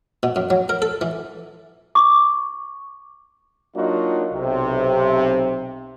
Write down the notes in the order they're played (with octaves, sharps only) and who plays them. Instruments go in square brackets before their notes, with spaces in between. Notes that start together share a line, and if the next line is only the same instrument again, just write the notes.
[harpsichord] B2
F#2
F#3
A#4
A4
E3
[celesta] C#6 D6
[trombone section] F#3 A#3 D4 D#4 F4 F#4
B1 C3